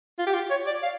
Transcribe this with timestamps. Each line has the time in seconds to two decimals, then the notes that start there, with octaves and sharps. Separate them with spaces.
0.18 F4
0.26 G4
0.34 F4
0.50 C#5
0.67 D5
0.83 F5